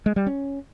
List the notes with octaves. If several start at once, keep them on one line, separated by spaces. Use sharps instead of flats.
G#3
G3
C#4